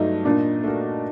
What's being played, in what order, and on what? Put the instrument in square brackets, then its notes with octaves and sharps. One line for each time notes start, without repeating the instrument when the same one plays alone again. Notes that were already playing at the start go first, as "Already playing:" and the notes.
Already playing: [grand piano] G2 F#3 A3 [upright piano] D#4
[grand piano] A#2 [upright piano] D4
[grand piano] A3 D4 F#4 A#4